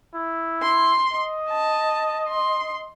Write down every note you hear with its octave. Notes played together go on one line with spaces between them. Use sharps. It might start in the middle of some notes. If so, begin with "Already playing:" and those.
E4
C6
D#5
A5
C6